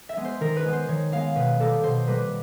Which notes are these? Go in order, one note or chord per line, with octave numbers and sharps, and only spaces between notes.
E5
G#3 B3
C5
D#3 A#4
B4
G#3 B3
C5
D#3 C#5
G#3 B3 F5
B2 B4
G3 A#3 A4
B2 C5
G3 A#3 B4